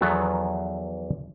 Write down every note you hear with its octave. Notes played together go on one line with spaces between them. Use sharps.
E2 D#3 F3 F#3 B3 A4